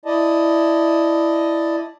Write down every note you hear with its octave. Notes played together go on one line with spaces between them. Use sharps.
E4 D5 D#5 A5